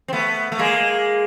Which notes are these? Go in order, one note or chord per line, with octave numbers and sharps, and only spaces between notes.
C4
A3 B3
A3
G#3 A#3